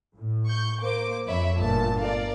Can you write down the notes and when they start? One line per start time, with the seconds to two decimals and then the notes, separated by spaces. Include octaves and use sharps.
0.17 A2
0.47 C#6 G6
0.80 A#3 C5 D6
1.27 F2 C#5 E5 B5
1.57 G1 A#2 A3 A5
2.00 A#4 D5 F5